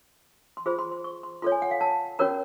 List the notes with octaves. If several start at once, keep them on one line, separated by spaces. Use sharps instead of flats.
C6
F4 G#4 C5 B5
C6
C6
C#6
C6
F4 A4 C#5 C6
G#5
F#5
F5
A5
C#4 F#4 A#4 C#5 A#5